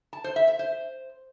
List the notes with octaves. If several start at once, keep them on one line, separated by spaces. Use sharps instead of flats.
A5
C5
E5
E5
C5